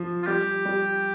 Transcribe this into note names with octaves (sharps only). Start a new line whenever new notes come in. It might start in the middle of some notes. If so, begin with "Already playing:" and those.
Already playing: F3
F4
G3 G4
G3